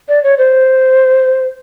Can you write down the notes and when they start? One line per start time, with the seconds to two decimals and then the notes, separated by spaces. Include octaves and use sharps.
0.09 D5
0.24 C#5
0.38 C5